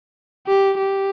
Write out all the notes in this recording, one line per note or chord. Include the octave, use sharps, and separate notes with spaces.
G4
G4